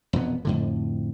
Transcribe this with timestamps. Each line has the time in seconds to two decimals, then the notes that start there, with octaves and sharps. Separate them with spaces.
0.13 E1 F2 A#2 B3
0.45 F2 A2 D3